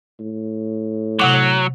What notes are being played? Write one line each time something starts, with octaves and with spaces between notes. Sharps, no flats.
A2
C3 F#3 F#5 D6